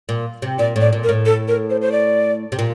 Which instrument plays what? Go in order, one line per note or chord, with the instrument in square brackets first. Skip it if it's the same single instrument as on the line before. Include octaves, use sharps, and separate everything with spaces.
[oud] A#2
C3
[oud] A#2 [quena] D5
[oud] A2
[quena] D5
[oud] A#2
[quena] A#4
[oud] A2
[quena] A4
A#4
C5
C5
D5
[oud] C3
A#2